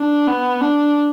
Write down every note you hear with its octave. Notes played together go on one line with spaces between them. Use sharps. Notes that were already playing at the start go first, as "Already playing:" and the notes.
Already playing: D4
B3
D4